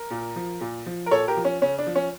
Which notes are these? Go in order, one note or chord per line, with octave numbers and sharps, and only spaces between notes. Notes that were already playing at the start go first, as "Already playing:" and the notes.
Already playing: A#4
A#2
F3
A#2
F3
A#4
A#2 A4 C#5
G4 A#4
F3
C#4
C#3 C#4
D4
F3
C#4